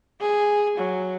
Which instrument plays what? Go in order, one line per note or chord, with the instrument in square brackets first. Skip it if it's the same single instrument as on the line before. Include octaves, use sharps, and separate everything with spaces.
[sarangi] G#4
F#3